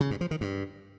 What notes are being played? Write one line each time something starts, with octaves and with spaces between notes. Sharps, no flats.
C#3
G2
F3
D#3
G2